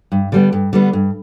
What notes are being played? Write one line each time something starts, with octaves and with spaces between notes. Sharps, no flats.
G2
D3 G3 B3
G2
D3 G3 B3
G2